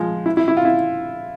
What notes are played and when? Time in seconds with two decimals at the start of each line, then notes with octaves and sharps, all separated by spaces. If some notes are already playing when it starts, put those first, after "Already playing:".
Already playing: F3 G#3
0.26 E4
0.37 E4
0.48 E4
0.57 F4
0.65 E4